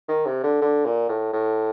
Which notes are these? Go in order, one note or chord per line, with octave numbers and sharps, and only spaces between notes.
D#3
C3
D3
D3
A#2
A2
A2